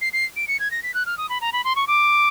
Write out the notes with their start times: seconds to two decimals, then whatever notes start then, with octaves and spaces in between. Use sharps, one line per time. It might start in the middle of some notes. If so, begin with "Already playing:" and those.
0.01 C7
0.13 C7
0.36 D7
0.47 C#7
0.59 G#6
0.71 A#6
0.83 B6
0.94 F#6
1.06 F6
1.18 D#6
1.29 B5
1.41 A#5
1.53 B5
1.64 C6
1.76 C#6
1.87 D6